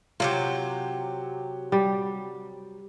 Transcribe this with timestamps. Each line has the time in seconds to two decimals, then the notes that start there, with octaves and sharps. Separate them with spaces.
0.20 C3 F#3 F4 G4
1.72 G3